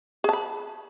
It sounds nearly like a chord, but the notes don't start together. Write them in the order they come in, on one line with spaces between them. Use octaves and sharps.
G#4 A5 B5